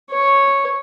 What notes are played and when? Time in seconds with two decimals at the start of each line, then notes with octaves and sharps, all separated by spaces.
0.11 C#5